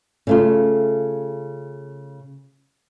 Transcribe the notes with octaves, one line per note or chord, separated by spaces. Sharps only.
C#3 A3 F4